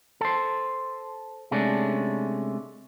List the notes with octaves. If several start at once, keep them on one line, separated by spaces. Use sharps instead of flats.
A4 C5
C3 G#3 A3 C#4 D4